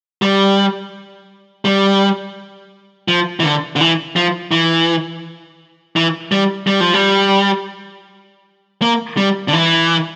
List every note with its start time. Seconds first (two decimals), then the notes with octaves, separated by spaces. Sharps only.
0.22 G3
1.65 G3
3.08 F3
3.40 E3
3.44 D3
3.76 D3
3.81 E3
4.16 F3
4.51 E3
5.96 E3
6.32 G3
6.67 G3
6.81 F3
6.94 G3
8.82 A#3
9.17 G3
9.48 D3
9.53 E3